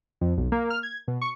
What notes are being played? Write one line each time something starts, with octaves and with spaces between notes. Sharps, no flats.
F2
B1
A#3
F6
G#6
B2
C#6